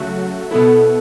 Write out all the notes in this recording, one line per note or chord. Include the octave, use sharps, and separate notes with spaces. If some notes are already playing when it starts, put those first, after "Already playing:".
Already playing: C#3 F#3 A3 F#4
B2 B3 E4 A4